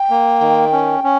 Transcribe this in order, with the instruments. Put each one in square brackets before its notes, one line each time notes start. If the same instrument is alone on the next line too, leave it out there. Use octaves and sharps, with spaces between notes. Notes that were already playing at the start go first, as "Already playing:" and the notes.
Already playing: [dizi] G5
[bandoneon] A#3
D#3
C#4
C#4